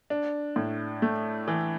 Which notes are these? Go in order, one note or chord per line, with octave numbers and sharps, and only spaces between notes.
D4
A2
A3
E3